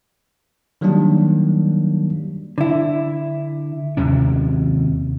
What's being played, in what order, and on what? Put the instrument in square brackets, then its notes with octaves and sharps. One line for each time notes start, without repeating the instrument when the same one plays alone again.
[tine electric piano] D#3 F#3 G3 A#3 D4
[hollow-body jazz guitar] D3 E4
[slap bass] D#2 C3 C#4